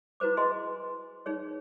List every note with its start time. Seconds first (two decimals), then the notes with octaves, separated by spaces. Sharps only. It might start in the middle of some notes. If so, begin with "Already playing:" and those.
0.20 E4 F#4 B4 C5 D6
0.37 G#4 D#5 G#5 C6
1.26 D#4 G#4 C#5